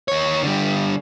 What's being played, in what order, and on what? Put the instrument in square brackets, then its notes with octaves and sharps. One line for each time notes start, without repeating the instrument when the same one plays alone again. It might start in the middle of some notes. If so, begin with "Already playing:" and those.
[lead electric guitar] D#2 C#5
D3 G3